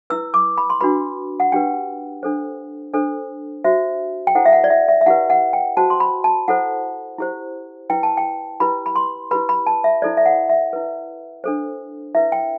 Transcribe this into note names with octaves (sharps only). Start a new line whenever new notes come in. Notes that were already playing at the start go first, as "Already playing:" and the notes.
E4 B4 E6
D6
B5
C6
D4 F#4 B4 B5
F#5
D4 G4 B4 G5
D4 A4 C5
D4 A4 C5
F#4 C5 E5
G5
E4 A4 C5 F#5
E5
F#5
D5
E5
E5
E5
E4 G4 B4 F#5
F#5
G5
F#4 C5 A5
C6
B5
A5
E4 A4 C5 F#5
E4 G4 C5
E4 B4 G5
A5
G5
E4 G4 B4 B5
B5
C6
E4 G4 B4 B5
B5
A5
E5
E4 A4 C5 D5
E5
F#5
E5
E4 B4
D4 A4 C5
E4 B4 E5
G5